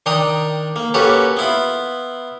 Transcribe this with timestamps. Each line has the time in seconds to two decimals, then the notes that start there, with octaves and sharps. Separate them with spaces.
0.06 D#3 D4 G5 A#5 D#6
0.76 A#3
0.94 A#3 C#4 F#4 G4 A4 B4
1.37 B3 E4 F4